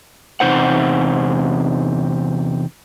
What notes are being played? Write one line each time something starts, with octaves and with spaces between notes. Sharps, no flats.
E2 C3 D#4 C5 F#5